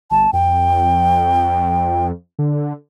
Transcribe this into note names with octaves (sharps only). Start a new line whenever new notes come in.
G1 A5
F2 G5
D3